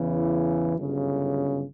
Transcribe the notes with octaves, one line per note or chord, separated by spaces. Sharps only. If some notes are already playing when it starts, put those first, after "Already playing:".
Already playing: E2 C#3 E3
G1 F#2 C#3